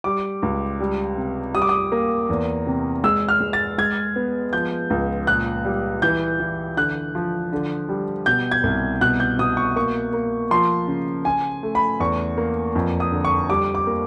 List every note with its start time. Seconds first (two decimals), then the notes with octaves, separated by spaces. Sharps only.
0.04 G3 D6
0.43 C#2
0.80 G3
1.18 C3
1.55 G3 D#6
1.62 D6
1.69 D#6
1.92 A#3
2.29 E2
2.67 C3
3.04 G#3 E6
3.29 F6
3.41 G#3
3.53 A6
3.78 G#3 G#6
4.16 B3
4.53 F3 G6
4.90 C#2
5.27 A#2 F#6
5.65 G3
6.02 E3 G6
6.40 E3
6.77 D3 F#6
7.15 F3
7.53 D3
7.89 G3
8.26 B2 G6
8.51 G#6
8.63 C2
9.01 B2 F#6
9.20 G6
9.39 B2 D#6
9.57 C#6
9.76 A#3 C#6
10.13 A#3
10.51 F3 C6
10.88 C#3
11.25 C#3 G#5
11.63 A3
11.75 B5
12.00 E2 C#6
12.38 A#3
12.75 F2
13.00 D#6
13.12 D3
13.25 C#6
13.49 G3 D6
13.75 D6
13.87 A#3